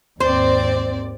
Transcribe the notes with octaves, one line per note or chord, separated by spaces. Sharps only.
D#2 G#2 C4 C5 D5